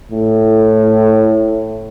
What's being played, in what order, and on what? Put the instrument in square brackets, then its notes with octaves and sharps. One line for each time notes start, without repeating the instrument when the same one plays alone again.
[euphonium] A2